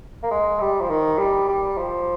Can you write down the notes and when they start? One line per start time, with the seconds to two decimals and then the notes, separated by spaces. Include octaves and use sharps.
0.23 A#3
0.31 G#3
0.61 G3
0.81 F3
0.90 D#3
1.19 G3
1.49 G3
1.78 F3